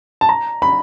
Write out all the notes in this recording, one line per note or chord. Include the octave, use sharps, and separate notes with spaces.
A5
A#5
B5